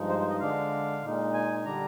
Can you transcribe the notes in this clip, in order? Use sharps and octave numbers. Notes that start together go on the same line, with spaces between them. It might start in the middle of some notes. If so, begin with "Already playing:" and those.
Already playing: G2 F3 G#3 D#4
C5
C5
D#5
D3 G#3 D4 F5
A#2 G#3 D#4
G#5
D3 G3 D4 A#5